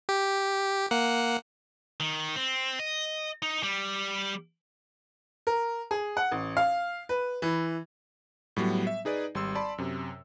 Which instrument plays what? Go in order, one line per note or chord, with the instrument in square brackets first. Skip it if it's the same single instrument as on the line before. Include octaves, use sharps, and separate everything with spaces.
[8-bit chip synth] G4
A#3 F#5
[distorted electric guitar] D#3
C4
D#5
D#4
G3
[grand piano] A#4
G#4
F#5
A1
F5
B4
E3
[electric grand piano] A2 F#3 G3 B3
E5
D#4 G#4 B4 D5
G#1 G3 C6 E6
D5 A5 B5 C6
F#2 C3